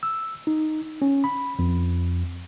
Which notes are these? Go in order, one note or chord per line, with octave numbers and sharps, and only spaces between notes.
E6
D#4
C#4
B5
F2